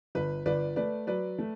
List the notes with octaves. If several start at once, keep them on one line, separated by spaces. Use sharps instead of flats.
G1 B4
G1 B4 D5
A3 B4 D5
F#3 B4 D5
A3